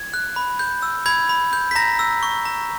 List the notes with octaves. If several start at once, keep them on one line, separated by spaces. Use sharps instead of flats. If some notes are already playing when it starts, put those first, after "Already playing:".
Already playing: G#6
F#6
B5
G6
E6
B5 G#6
B5
G6
B6
A#5 A#6
E6
C#6
A#5